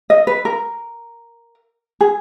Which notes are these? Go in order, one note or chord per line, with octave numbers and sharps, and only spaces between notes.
D#5
B4
A#4
G#4